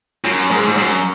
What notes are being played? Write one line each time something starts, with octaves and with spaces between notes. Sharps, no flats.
F#2
G#2
G#2
F#2